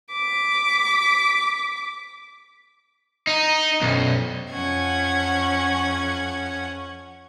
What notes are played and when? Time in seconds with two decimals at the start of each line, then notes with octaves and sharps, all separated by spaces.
0.12 D6 B6
3.27 D#4
3.81 B1 F#2
4.51 F2 C#4 F#5 G#6